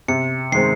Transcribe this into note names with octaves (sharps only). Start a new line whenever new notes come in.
C3 C#7
D#3 G#3 C4 C7